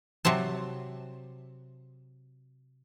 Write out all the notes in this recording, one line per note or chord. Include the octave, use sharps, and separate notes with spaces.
C3 F#3 C4 A5